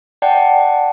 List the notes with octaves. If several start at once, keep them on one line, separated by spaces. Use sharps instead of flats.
D5 F#5 G5 A5